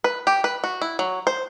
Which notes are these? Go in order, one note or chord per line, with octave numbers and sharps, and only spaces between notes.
B4
G4
B4
F#4
E4
F#3
C5